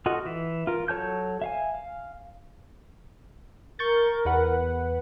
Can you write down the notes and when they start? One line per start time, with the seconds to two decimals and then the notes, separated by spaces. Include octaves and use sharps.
0.06 F4 F#4 A4 D#5
0.25 E3 E5
0.67 F4 A#4
0.88 F#3 A4 C#5 A5 G6
1.42 E5 F5 G#5
1.74 F5
3.79 A#4 C#6 G6 A6
4.25 E2 B4 F#5